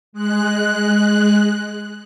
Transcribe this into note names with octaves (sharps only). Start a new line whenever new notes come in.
G#3 F#6